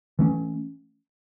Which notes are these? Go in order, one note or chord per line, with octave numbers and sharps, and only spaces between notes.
E3 A3 C#4